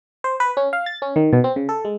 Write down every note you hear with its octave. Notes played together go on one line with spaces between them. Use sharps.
C5
B4
C#4
F5
A6
C#4
D#3
B2
C4
C#3
A4
G#3